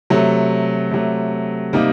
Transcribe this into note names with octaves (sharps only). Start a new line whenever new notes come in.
C3 F#3 A3
C3 F#3 A3
C3 G3 A#3 D#4